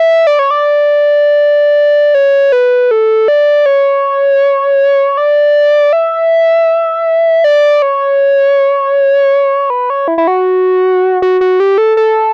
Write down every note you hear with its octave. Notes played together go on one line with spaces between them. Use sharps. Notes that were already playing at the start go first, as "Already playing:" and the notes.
Already playing: E5
D5
C#5
D5
C#5
B4
A4
D5
C#5
D5
E5
D5
C#5
B4
C#5
E4
E4
F#4
F#4
F#4
G4
A4
A4